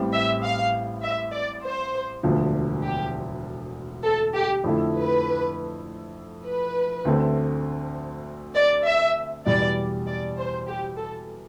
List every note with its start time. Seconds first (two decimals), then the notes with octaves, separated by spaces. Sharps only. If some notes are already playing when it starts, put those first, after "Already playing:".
Already playing: A1 A2 G3 C4
0.12 E5
0.43 F5
1.02 E5
1.33 D5
1.63 C5
2.23 E1 D2 D3 F3
2.83 G4
4.04 A4
4.35 G4
4.64 F2 D3 A3 E4
4.95 B4
6.45 B4
7.05 D2 D3 A3 C4
8.55 D5
8.85 E5
9.46 E2 B2 G3 D5
10.06 D5
10.37 C5
10.67 G4
10.97 A4